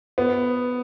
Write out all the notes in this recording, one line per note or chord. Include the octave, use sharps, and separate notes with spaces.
B3